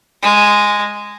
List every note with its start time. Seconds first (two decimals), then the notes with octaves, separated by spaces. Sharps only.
0.23 G#3